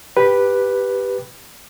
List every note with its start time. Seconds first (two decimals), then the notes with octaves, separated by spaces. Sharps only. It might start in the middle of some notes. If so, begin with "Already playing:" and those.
0.17 G4 B4